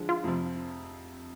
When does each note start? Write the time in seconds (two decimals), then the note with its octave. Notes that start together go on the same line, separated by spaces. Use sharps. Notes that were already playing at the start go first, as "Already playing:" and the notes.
Already playing: D3 F3 G#3
0.09 F4
0.24 F2 C3 F3